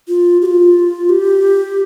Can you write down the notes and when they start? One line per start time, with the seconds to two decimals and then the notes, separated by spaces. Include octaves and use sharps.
0.08 F4
0.42 G4
0.45 F4
1.09 G4